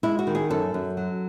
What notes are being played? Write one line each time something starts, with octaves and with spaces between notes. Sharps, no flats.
G#3 E4
F#4
D#3
G#4
F#2 A4
F#2
F#3